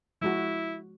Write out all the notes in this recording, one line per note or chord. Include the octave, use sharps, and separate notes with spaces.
F3 G#3 E4 F#4